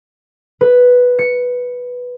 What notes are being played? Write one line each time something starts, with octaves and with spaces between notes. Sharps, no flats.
B4
C#7